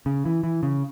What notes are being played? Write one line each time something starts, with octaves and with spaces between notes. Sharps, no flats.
C#3
E3
E3
C#3